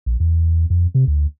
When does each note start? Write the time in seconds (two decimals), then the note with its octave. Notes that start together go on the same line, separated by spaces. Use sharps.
0.06 A#1
0.20 E2
0.70 F2
0.95 C3
1.07 D2